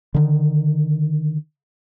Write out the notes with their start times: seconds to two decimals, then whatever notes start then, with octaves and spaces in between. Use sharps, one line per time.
0.14 D3 D#3